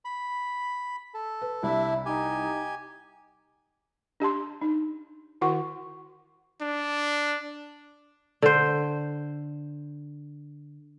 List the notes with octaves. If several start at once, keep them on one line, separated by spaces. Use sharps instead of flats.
B5
A4
B4
C2 D4 E4 E5
D#4 G4 G#5
D4 G4 A5 C6
D#4
D#3 E4 F#4 A#4 F#5 C#6
D4
D3 C5